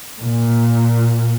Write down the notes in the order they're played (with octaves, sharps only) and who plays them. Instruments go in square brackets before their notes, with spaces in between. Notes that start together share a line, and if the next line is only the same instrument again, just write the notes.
[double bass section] A#2